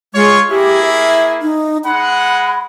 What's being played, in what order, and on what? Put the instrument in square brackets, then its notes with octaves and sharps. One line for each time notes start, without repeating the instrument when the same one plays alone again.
[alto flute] G#3 [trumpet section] F4 C#5
[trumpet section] A#3 E4 G#4 [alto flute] G4
[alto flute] E5
D#4
[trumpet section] G#3 F#5 [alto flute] B5